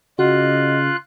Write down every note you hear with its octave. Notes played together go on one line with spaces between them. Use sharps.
C#3 F4 F#4 D#5 F#6